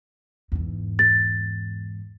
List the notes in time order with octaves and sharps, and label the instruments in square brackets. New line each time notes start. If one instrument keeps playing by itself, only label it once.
[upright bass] E2 G#2
[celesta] A6